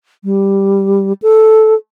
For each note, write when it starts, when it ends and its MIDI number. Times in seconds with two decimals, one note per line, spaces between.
0.24 1.13 55
1.22 1.74 69